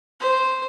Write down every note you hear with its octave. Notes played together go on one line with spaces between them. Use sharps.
C5